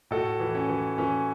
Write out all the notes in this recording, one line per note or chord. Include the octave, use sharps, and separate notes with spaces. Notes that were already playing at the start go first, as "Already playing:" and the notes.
A2 F#4 A4
E3
C#4
E3
E3 C#4